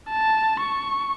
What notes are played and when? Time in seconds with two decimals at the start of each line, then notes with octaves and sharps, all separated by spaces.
0.10 A5
0.60 C#6